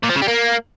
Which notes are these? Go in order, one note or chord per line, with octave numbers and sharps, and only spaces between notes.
A#2
F3
C#3
G3
A#3